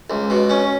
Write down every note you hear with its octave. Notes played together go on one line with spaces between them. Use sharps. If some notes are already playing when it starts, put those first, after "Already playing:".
C#2
B2
C#4